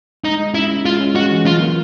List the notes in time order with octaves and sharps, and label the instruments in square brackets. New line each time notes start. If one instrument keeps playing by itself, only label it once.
[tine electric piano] G#3 [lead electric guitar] D#4
[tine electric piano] G#3
[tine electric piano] C#4 [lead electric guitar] E4
[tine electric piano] C#4
[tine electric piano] G#3 [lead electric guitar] F4
[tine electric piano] C#4
[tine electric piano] G#3 [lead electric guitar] F#4
[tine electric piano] E3
[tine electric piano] F#3 [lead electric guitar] F4
[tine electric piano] A#3